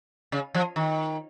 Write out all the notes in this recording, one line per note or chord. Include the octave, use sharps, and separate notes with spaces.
C#3
F3
D#3